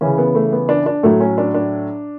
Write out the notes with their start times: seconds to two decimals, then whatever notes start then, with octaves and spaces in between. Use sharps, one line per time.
0.01 C#3 E3 C#4
0.18 B3
0.35 A3
0.52 B3
0.69 D4
0.86 D4
1.03 A2 F#3 A3
1.20 C#4
1.38 D4
1.54 D4